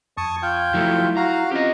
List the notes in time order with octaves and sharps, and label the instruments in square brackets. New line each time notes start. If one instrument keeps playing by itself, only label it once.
[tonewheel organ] F2 G#6 [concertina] A5 C#6 D#6
[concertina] F4 G5
[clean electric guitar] F3 F#3 A3 [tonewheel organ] E4
[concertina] F#4 F5 [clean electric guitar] A#5
[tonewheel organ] C4 C#4 F4 [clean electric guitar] G4 D#5